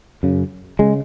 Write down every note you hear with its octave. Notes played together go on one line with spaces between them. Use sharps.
F#2 C#3
C#3 G#3